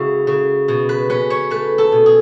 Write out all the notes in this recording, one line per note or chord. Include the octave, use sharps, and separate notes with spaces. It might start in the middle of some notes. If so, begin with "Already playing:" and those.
Already playing: C#3 G#3 E4 F#4 G#4
C#3
B2
B4
C#4 B4
C#5
A3 B4
A4
B2
G#4